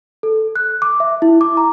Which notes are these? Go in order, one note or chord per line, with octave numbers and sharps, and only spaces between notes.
A4
F#6
D6
E5
E4
D6
A#5